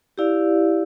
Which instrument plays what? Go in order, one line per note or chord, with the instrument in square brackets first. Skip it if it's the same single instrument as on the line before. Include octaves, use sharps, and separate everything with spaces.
[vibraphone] E4 G4 D5 F5